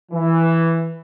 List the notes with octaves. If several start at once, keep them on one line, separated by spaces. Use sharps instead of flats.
E3